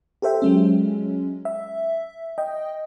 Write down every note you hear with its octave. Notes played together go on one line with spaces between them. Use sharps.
G4 A4 C5 E5 G5
F#3 G#3 C#4
E5
D#5 G5